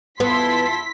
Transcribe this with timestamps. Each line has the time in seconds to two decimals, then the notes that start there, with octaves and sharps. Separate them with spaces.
0.20 E2 B3 E4 F4 A5 C6 B6